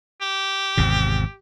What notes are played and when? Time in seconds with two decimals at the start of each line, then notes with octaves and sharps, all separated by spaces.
0.21 G4
0.77 G#1 E2 C3